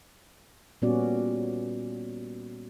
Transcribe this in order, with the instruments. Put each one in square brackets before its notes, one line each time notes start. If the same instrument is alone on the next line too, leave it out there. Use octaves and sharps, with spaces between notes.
[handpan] A#2 G3 B3 C#4 F#4 D5